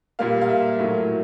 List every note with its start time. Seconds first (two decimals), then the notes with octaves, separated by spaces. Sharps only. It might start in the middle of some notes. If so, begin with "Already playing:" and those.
0.19 A#2 G3 A#3 F5
0.41 F5
0.49 E5
0.79 A2 F#3 A#3